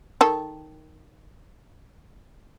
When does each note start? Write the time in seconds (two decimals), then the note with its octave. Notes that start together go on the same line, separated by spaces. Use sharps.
0.21 D#3 A4